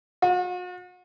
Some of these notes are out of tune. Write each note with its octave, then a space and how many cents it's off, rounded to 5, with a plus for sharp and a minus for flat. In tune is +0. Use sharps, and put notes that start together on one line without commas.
F#4 -45